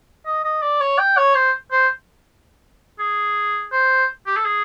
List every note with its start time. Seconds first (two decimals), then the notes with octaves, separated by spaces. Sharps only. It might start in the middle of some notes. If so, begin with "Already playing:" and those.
0.26 D#5
0.44 D#5
0.62 D5
0.81 C#5
0.99 G5
1.17 C#5
1.35 C5
1.72 C5
2.99 G#4
3.72 C5
4.26 G4
4.37 A4
4.45 G#4